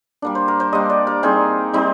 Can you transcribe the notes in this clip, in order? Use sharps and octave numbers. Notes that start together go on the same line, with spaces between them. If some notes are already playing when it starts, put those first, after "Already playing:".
G3 A#3 D4
C5
A#4
C5
G3 A#3 D4 D#5
D5
A#4
G3 C4 D#4 G#4
G3 C4 D#4